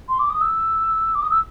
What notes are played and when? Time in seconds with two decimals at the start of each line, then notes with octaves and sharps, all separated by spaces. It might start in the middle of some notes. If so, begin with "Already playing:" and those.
0.09 C6
0.19 D6
0.30 D#6
0.41 E6
1.15 D6
1.22 D#6
1.31 E6